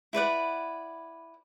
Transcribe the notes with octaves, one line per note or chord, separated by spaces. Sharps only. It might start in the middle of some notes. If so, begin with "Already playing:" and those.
E4 B4 D5 F#5